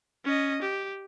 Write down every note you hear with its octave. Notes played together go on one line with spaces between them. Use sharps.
C#4 D#5
G4